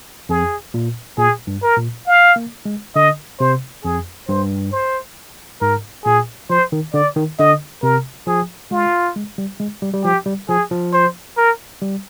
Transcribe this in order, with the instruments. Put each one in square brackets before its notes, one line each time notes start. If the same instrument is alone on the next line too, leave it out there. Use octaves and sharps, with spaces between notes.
[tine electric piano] F2 [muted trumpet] G#4
[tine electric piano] A#2
[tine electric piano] A#2 [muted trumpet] G#4
[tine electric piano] G2
[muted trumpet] A#4
[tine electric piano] A#2
[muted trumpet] F5
[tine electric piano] A#3
G#3
[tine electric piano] D3 [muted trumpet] D#5
[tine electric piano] C3 [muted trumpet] C5
[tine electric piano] F2 [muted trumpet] G#4
[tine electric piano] G2 [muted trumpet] C5
[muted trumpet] C5
[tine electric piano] G#2 [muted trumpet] A#4
[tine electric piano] A#2 [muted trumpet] G#4
[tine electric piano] F3 [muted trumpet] C5
[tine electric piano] D#3
[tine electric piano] D3 [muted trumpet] D5
[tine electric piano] D#3
[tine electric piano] D3 [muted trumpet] D#5
[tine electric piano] C3 [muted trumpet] A#4
[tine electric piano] F3 [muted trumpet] G#4
[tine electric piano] G#3 [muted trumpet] F4
[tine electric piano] G#3
G3
G#3
G3
G3
[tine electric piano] F3 [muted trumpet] G4
[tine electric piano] G3
[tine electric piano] F3 [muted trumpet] G#4
[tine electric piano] F3
[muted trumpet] C5
A#4
[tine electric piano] G3